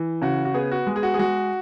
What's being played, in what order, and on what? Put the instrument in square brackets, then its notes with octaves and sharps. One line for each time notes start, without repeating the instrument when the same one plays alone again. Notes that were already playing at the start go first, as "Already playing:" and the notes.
Already playing: [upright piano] E3
[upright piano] C#3 [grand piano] F#4
[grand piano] F#4
[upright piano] B3 [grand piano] G#4
[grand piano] F#4
[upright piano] G#3
[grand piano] G#4
F#4
G#4
[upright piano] G#3 [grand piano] F#4